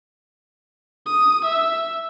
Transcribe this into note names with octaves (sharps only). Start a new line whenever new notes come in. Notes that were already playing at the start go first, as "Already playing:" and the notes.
D#6
E5